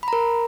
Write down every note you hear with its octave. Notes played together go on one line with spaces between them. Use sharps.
A#4 A#5 B5